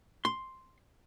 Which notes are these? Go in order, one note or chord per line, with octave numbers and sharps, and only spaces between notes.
C6